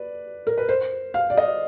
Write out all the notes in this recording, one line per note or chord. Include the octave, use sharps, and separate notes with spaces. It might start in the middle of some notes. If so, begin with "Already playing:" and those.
Already playing: B4 D5
A#4
B4
C5
F5
D5
D#5